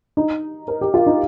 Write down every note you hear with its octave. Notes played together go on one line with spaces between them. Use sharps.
D#4
A#4
G4
F4
D#4